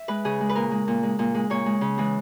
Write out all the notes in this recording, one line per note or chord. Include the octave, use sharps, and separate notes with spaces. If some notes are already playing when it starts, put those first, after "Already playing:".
Already playing: E5
G#3 B4
C#3 G#4
G#3
B4
A#2 A#4
G#3
A#2
G#3
A#2
G#3
A#2 C#5
G#3
C#3
E3 G#3